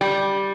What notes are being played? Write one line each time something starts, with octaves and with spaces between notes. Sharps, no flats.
G3